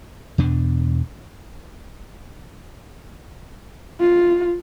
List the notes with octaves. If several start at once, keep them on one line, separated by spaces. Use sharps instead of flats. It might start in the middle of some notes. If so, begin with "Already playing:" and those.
E2 B2 D4
F4